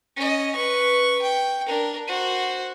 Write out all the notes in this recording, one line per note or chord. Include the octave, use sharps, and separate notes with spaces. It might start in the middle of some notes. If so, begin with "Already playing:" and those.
C#4 D#5
B4 C#6
G5
D4 A#4
F#4 C5